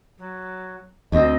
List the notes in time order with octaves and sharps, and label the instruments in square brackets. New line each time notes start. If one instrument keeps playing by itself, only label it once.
[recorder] F#3
[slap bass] D2 [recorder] C4 [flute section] D#5